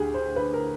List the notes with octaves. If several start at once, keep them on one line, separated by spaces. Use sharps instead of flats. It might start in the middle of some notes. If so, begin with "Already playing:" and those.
Already playing: D2 D3 G4 G#4
C5
B4
A#4